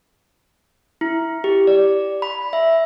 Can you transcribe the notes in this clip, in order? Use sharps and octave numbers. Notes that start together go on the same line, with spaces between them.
E4
G4
D5
B5
E5